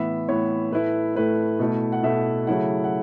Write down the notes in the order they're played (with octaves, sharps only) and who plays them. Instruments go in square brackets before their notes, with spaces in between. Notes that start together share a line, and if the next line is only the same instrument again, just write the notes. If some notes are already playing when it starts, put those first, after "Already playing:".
Already playing: [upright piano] A2 E3 B3 E5
A2 E3 B3 C#5
A2 A3 E4 B4
A2 A3 E4 B4
B2 A3 E4
F#5
B2 A3 E4 E5
C#3 F#3 A3 E4 F#5
F#5